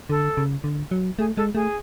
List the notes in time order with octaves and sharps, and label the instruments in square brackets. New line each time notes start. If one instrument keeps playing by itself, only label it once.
[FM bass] D3 [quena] A4
[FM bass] C#3
D3
F#3
[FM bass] A3 [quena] G#4
[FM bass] G#3 [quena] A4
[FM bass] A3 [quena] G#4